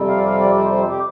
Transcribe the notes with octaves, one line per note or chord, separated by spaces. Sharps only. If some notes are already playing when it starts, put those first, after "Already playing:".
Already playing: F2 C3 G3 C4
F5
D5
F5
D5
C5
C5
G4